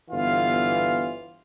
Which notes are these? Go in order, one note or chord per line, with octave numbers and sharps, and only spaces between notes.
G1 E3 B3 F4 F5